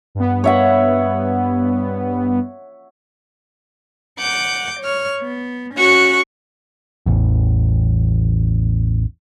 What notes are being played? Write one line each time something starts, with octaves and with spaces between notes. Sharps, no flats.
G2 B3
C#5 E5 F#5
F#5 D6 G6
C#5 F6
B3
C#4 F#4 C#6 F#6
A1 E2